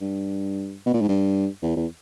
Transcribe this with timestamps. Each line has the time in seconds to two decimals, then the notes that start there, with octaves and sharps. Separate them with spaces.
0.01 G2
0.86 B2
0.94 A#2
1.01 G#2
1.09 G2
1.63 E2
1.77 E2